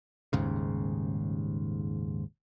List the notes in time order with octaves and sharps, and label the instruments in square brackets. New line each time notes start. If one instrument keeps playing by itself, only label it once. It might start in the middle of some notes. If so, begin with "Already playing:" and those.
[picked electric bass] D#1 D#2 G#2 C#3